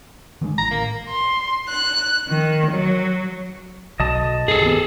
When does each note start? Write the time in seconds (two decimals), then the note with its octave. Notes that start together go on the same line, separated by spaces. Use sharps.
0.41 D3 D#3 G#3
0.58 A1 A#5
0.71 A#3
1.09 C6
1.67 F#6
2.28 D#3
2.69 F#3
4.00 B1 F#3 D#5 A5 D#6
4.48 G2 G#4 A4
4.61 D#3 B3